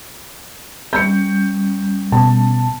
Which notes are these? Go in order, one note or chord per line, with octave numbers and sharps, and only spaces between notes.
G3 C#4 G6 C#7
B2 A5